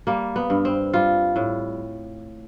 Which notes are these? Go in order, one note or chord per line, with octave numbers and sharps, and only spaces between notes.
G3 A#3
B3
G2
C4
G3 F4
A2